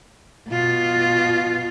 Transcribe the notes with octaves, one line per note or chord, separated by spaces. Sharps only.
B2 F4